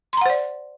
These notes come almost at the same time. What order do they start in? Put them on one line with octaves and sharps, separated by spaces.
C6 A#5 F#5 C5 D5